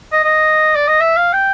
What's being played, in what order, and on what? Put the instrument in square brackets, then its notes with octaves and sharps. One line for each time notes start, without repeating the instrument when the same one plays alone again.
[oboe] D#5
D#5
D5
D#5
E5
F5
G5